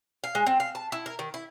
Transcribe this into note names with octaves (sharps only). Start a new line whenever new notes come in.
F5
G#3
C4
F5
A5
E4
A#4
D#3
E4